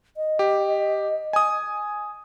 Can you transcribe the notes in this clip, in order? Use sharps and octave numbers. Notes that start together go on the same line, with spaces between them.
D#5
G4
G#5 D#6